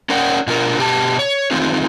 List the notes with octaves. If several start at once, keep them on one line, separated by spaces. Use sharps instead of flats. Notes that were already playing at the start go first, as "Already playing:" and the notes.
C#4 A#4 C#5 D5 F#5 G5
B2 D4 F4 F#4 A#4
B2 G4 A5
C#5
D#3 E3 A3 C4 D#4 F4